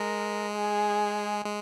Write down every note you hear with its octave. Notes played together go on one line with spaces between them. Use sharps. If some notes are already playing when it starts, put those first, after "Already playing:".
Already playing: G#3 A#4
G#4
G#3